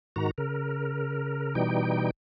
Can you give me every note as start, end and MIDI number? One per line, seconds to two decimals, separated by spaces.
0.16 0.31 44
0.16 0.31 51
0.16 0.31 66
0.16 0.31 82
0.38 1.55 49
0.38 1.55 70
1.55 2.10 47
1.55 2.10 52
1.55 2.10 55
1.55 2.10 63
1.55 2.10 79